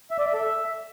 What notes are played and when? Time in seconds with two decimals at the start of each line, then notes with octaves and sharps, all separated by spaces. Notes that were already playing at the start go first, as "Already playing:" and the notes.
0.11 E5
0.18 D5
0.26 E5
0.33 A4
0.41 E5